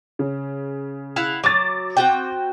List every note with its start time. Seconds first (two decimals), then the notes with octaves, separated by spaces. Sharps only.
0.19 C#3
1.16 E4 F5 F#5
1.44 F#3 D6 A6
1.97 C4 F#4 G5